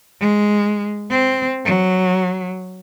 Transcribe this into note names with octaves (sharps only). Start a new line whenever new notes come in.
G#3
C4
F#3